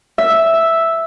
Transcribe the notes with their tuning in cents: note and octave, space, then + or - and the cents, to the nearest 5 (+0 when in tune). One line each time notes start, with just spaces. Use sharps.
E5 +0 E6 +0